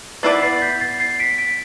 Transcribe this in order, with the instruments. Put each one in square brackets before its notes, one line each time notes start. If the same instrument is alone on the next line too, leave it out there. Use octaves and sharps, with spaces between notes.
[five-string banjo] B3 E4 B4 D5 [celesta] A6 C7
[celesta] A6 C7
A6
G6 B6
A6 C7
A6 C7
B6 D7
B6 D7